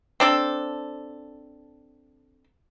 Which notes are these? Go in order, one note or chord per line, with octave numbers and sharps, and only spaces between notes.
C4 D4 A4